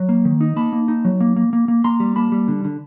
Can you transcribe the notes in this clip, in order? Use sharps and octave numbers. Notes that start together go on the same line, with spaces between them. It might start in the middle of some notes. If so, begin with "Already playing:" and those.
Already playing: F#3
A#3
D#3
D#4
A#3 A5 B5
A#3
D#4
F#3
A#3
A#3
A#3
A#3
A#3 A#5 C6
G3
A#3 A5 B5
G3
D3
D3